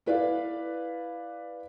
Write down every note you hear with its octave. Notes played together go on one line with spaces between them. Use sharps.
E4 B4 D5 F5